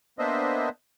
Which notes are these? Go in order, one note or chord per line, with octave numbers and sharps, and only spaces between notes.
A#3 B3 D4 C5 D#5 E5